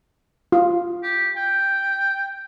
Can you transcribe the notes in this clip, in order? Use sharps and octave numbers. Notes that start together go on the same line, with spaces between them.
F4
G4
G5